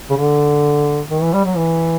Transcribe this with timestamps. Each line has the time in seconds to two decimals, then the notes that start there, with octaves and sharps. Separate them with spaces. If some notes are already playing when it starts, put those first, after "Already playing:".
0.10 C#3
0.17 D3
1.10 D#3
1.22 E3
1.33 G3
1.45 F#3
1.57 E3